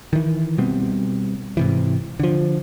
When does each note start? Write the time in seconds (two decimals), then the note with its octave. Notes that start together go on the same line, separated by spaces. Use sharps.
0.13 D#3 E3
0.58 B2 G3 B3 C4
1.57 G#2 C3 E3
2.20 D3 F3